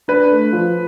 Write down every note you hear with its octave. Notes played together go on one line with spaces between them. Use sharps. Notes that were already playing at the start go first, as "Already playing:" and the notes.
D4 B4
A3
F3